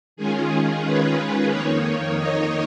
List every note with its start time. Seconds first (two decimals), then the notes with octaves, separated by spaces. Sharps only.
0.17 D#3 G#3 C#4 F4 G#4
0.84 B4
1.50 F2 D#3 A#3 D#4 C#5
2.17 D#5